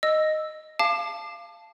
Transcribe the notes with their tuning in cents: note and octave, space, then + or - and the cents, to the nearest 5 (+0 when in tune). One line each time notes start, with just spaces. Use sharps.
D#5 +0 E6 +0
F5 -15 A5 +0 D6 +30